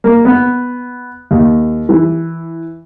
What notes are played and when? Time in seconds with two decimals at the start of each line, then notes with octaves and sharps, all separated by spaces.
0.04 A#3
0.25 B3
1.31 D#2
1.89 E3